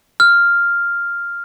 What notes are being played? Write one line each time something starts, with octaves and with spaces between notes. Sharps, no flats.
F6